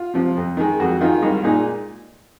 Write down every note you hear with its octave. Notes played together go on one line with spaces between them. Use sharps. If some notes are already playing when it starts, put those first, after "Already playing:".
Already playing: F4
C3 F3
F2
D#3 G#3
F2 F#4
D#3 G#3 F4
C2 D#4
A#2 G#3 D#4